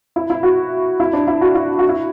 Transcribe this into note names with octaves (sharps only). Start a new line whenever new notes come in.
E4
E4
F#4
E4
D4
E4
F#4
E4
F#4
E4